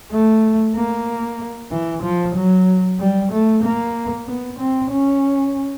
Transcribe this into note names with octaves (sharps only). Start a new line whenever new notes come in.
A3
A#3
E3
F3
F#3
G3
A3
A#3
B3
C4
C#4